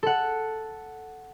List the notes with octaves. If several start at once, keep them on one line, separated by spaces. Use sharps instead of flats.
A4 F#5